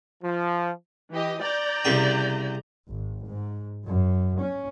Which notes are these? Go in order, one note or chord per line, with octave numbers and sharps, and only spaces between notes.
F3
E3 G4 D#5
D5 A#5 G6
C2 C#3 G5
G#1
G#2
F#2
C#4